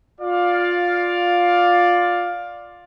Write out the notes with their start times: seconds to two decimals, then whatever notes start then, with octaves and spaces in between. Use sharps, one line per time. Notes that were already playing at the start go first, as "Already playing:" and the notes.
0.21 F4 D5 F5